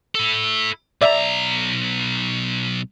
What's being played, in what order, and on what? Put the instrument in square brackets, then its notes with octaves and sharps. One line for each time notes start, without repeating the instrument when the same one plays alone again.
[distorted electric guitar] E4 A4
[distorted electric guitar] B1 A#5 [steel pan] D5 E5